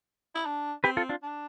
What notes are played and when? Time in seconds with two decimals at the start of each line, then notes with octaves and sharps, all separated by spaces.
0.35 E4
0.45 D4
0.84 C4 G4 B4
0.97 F4 A4
1.09 D4 F4
1.22 D4